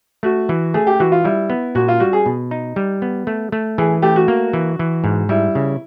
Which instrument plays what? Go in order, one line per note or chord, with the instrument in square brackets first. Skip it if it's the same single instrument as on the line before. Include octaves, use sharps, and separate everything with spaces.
[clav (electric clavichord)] A3 [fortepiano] F#4
[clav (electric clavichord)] E3
[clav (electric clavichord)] A3 [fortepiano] G#4
[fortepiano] G4
[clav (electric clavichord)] E3 [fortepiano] F#4
[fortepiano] F4
[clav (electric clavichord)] G3 [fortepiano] E4
[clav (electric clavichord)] B3
[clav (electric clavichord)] A#2 [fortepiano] F#4
[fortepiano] F4
[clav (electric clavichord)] G3 [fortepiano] F#4
[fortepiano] G#4
[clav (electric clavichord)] B2
D#4
G3
B3
A3
A3
[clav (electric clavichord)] E3 [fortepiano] G#4
[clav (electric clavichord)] A3 [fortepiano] G4
[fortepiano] F#4
[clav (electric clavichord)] A#3
E3
E3
G#2
[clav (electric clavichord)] G3 [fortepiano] E4
[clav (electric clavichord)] C#3